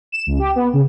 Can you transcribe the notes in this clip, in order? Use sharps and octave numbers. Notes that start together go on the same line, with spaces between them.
E7
C#2
G4
B3
C#3